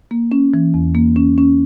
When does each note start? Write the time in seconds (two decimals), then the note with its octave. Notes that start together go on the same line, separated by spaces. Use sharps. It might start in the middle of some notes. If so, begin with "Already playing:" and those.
0.11 A#3
0.32 C#4
0.54 E3
0.74 E2
0.95 A#3
1.16 C#4
1.38 C#4